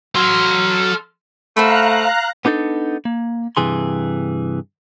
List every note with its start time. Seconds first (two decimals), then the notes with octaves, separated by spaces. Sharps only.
0.15 F#3 A4 C6 F6
1.57 A3 C5 F5 F#5 A#5 B5 F#6
2.45 B3 D4 D#4 G#4 A4
3.05 A#3
3.57 G2 C3 E3 G#4 C6